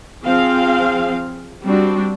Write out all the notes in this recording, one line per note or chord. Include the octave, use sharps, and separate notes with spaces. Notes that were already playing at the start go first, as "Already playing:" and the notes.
F3 C4 G#4 F5
G3 C4 D4 F#4